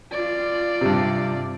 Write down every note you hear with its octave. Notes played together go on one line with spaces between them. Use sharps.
F4 D5
G2 C3